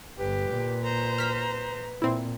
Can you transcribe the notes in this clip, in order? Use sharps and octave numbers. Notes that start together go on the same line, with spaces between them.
G1 G4 B4
A#2
B4 C5 A#5
F6 B6
A#2 C4 E4